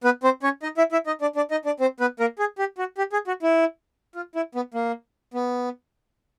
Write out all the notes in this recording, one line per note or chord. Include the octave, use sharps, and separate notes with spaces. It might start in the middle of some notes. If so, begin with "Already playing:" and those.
B3 B4
C4 C5
C#4 C#5
D#4 D#5
E4 E5
E4 E5
D#4 D#5
D4 D5
D4 D5
D#4 D#5
D4 D5
C4 C5
B3 B4
A#3 A#4
G#4
G4
F#4
G4
G#4
F#4
E4
F4
E4
B3
A#3
B3